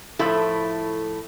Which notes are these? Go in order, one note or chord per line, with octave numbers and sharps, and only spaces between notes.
A2 F3 A3 E4 A4